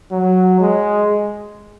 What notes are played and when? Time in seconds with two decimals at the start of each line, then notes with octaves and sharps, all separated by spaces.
0.11 F#3
0.60 G#3